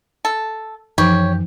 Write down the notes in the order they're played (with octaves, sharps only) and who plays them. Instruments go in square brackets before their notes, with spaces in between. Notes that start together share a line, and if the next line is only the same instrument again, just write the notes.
[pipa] A4
[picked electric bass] F#2 E3 [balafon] F3 D#4 [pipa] G4 [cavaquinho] C#5